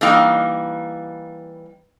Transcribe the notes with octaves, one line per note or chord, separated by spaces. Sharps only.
E3 G3 A#3 D#4 F5 G5